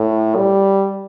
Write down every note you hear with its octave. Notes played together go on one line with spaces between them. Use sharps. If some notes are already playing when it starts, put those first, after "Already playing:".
Already playing: A2
G3